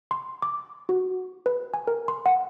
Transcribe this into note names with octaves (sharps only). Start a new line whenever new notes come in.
C6
D6
F#4
B4
G#5
A#4
C6
F#5